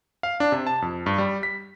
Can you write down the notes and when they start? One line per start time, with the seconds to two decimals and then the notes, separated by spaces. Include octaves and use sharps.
0.23 F5
0.40 D4
0.52 C3
0.67 A5
0.82 F2
1.06 G2
1.18 G3
1.43 B6